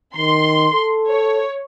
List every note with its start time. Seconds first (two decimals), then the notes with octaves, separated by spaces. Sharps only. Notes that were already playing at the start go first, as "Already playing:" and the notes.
0.17 D#3 C6
0.74 A4
1.10 C#5